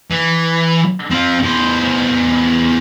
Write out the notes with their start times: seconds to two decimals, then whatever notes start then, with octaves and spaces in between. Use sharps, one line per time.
0.11 E3
1.11 C4 F4
1.43 E2 C5